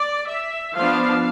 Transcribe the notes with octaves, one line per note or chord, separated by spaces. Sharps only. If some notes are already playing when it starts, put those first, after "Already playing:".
Already playing: D5
E5
F3 B3 D4 F5